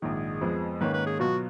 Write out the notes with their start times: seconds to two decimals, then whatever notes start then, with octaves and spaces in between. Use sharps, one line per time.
0.02 A#1 G#2 D#3 G#4
0.41 F2 F3 G#3 B3
0.80 G#2 D#3 A#3 C#4 B4
0.93 B4
1.06 G#4
1.19 B2 F#3 B3 F4 F#4